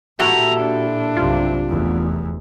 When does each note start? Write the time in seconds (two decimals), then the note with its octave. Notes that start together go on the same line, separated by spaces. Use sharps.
0.20 A#2 E4 F#4 G4 A4 A#5
0.61 D4
1.17 B1 G2 C3 F4
1.69 F1 E2